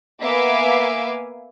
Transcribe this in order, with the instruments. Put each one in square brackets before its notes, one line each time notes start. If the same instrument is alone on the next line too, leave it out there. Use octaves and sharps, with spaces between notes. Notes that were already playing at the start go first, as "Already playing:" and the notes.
[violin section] A#3 B3 E5 F5 G#5 D6